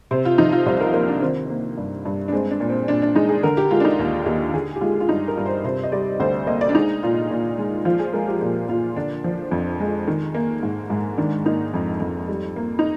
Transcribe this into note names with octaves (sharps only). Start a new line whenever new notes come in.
C3 C5
F4
F3 D#4
F4
C2 C5
A#4
A#3 A#4
D4
D#3 C4
A#3 C4
G2
G2
D4
G#3 C4
D4
A#2
C4
A#2 D4
D4
G#3 D#4
G#4
D3 A#4
G4
G#3 F4
D4
D#4
D#2
D#2 G4
D3 G#4
G4
G#3 F4
F4
G2 D#4
A#4
G2
C5
C3 C5
D#5
G3 D5
D2 C5
A#3 D#5
D5
D4
G#3 D#4
A#2 F4
A#2
G#3
F3 F4
G#4
G#3 A#4
G4
A#2 G4
A#2 F4
D3 D4
F3
F2
G#3
D#3
A#3
G#2
G#2
D#3 D4
A#3 D#4
F2
F2
G3
A#3
D#4